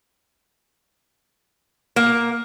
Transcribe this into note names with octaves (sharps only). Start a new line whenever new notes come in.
A#3